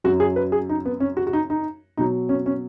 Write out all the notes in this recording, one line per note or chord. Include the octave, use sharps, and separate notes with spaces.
F#2 F#3 F#4
G#4
B4
G#4
D#4
B3
C#4
F#4
F#4
D#4
D#4
B2 F#3 D#4
C#4
C#4